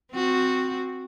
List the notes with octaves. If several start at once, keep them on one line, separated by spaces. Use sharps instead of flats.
C4 F#4